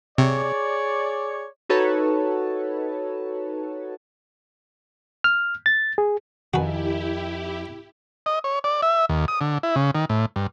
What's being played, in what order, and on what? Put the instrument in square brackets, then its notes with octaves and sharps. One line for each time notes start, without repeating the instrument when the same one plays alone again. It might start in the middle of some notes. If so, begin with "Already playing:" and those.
[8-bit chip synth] C3 [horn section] G#4 C#5 D5
[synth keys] D#4 F#4 A4 B4 C#5 A5
[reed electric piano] F6
A6
G#4
[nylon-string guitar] F2 A#4 G#5 [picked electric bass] D#3 [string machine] E4 G4 [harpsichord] F#4 B4
[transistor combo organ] D#5
C#5
D5
E5
D#2
D#6
D3
E4
C#3
D#3
A2
G2